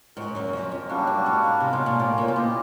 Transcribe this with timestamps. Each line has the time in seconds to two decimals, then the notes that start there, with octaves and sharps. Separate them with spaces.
0.16 G#2 C#4 F#4 A#4
0.35 F#2
0.53 F2
0.71 F2
0.89 F#2 G3 A#3 D4 F#4
1.07 G2
1.26 G#2
1.60 C3 A#3 C#4 F4 A#4
1.73 B2
1.86 A#2
1.99 A2
2.18 A#2
2.28 B2
2.35 A#2 E4 G4 C5 D#5